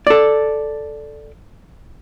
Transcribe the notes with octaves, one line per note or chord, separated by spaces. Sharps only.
A4 D5